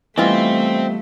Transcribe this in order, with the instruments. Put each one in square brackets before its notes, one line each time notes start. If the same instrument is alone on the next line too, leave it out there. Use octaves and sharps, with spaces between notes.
[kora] E3 E4 F4 [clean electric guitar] G3 B3 D#5 [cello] A3 [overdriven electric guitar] C4